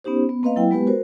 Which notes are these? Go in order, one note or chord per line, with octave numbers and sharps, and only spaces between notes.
B3 C#4 D#4 G4 C5
B3
A#3 C4 B4 D#5 F5
F#3 E4 G5
G#3 B3 G4 B4
F#4 A#4 C5